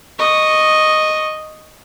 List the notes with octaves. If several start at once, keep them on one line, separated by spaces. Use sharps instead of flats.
D#5 C#6